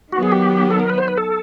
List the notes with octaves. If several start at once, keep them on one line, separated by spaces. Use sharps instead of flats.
D#3 F#3 B3 F#4
G#4
G4
A4
A#4
B4
C5
B4
A4